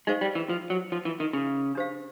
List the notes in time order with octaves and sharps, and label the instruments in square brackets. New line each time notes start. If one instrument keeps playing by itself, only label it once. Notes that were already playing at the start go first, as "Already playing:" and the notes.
[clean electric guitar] G#3 [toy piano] D#4 G4 C5 F5
[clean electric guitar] G3
E3
F3
F#3
F3
E3
D#3
C#3
[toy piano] D4 G4 C5 F5